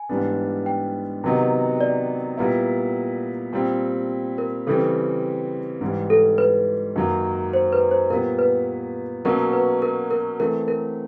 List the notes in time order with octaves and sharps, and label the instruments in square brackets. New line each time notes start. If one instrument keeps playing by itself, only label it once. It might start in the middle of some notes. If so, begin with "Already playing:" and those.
Already playing: [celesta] G#5
[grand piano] G#2 E3 G3 B3 D4
[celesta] G5
[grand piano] C3 D#3 F#3 B3 D#4
[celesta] D5
[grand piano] A#2 G3 B3 E4
A#2 G3 C4
[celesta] A#4
[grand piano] C#3 E3 G3 C4 [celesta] A4
[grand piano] G#2 E3 G3
[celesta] A4
B4
[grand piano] F#2 D#3 F#3 A#3
[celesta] C5
B4
C5
[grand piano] A#2 G3 B3 [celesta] A#4
[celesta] B4
[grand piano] B2 F#3 A#3 C#4 [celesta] A#4
[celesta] B4
A#4
A#4
[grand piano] E3 A3 C4 [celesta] A#4
[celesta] A#4